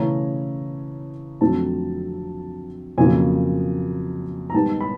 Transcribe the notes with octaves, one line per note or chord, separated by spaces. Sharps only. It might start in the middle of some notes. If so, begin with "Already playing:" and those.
Already playing: C#3 E3 A3 C#4 A#5
F2 D3 F#3 A3 C4 A5
F2 C#3 F#3 A#3 G#5
A#5
G#2 D#3 G3 B3 A5
B5